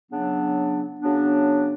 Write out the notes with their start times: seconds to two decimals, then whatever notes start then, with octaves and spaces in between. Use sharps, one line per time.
0.10 C#3 F#3 B3 D4
1.01 C#3 F#3 B3 D4